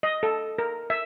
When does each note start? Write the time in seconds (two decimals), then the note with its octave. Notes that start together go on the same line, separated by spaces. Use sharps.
0.03 D#5
0.23 A4
0.58 A#4
0.90 E5